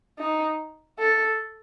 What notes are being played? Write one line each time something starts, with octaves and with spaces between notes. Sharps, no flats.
D#4
A4